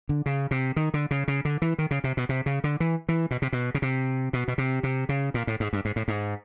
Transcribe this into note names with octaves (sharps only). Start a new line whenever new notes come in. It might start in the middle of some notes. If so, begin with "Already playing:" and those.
D3
C#3
C3
D#3
D3
C#3
C#3
D3
E3
D#3
C#3
C3
B2
C3
C#3
D3
E3
E3
B2
C3
B2
C#3
C3
B2
B2
C3
C3
C#3
A#2
A2
G#2
G2
G#2
A2
G#2